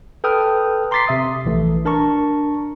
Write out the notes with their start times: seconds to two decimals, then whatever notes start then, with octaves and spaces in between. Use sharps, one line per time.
0.24 A4 B4 G5 D#6 F6
0.91 A#5 C6 D6 A6 B6 C7
1.07 C3 E5 D#6
1.45 A#1 E3 A3
1.85 D4 A#4 A5 A#5 C#6